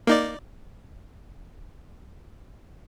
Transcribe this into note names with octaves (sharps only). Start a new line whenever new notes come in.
A#3 D#4 D5